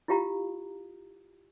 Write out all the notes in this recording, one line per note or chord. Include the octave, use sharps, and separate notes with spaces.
E4 F4 G4 F5 A#5